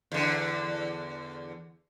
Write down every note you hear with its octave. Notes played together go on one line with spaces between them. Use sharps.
E2 D3